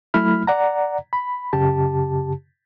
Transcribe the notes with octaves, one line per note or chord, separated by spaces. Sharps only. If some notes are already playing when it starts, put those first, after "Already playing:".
F#3 A3 E4 B5 F6
D5 F#5 A#5
B5
F#2 C#3 G4 A5